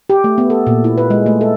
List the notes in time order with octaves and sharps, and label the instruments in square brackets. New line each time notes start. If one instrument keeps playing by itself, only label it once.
[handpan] G4
A3
B3
A4
A#2
E4
B4
G#3
A3
A4